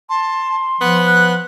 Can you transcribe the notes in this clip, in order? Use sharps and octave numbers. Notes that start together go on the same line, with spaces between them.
A5 C6
F3 B3 F#5
F#6